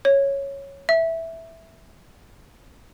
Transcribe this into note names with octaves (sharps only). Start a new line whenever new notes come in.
C#5
E5